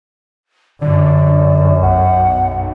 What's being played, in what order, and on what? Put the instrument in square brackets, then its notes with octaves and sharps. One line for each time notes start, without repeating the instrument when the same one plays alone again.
[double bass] F#2 [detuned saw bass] D3 [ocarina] D5
[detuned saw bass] B1 [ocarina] F#5